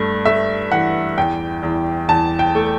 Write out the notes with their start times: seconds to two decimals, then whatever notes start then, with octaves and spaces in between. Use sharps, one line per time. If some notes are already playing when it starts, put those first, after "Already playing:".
Already playing: G2 A3
0.25 A3 E5
0.71 E3 F#5
1.18 E2 G5
1.63 E2
2.09 E2 A5
2.39 G5
2.55 A3